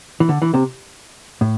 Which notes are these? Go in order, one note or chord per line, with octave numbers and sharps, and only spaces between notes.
E3
D3
E3
C3
A2